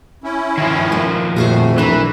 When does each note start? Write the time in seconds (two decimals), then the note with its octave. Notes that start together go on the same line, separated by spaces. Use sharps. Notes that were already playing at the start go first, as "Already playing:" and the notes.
0.24 C#4 E4
0.57 D#3 F3
0.92 A#3
1.36 F2 A#2 A3 F#4 G#4 C5
1.78 B1 E3 D4 A#4